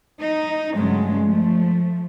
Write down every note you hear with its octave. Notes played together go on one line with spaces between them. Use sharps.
D#4
G2 C#3 F#3 G#3 A3
F3 A3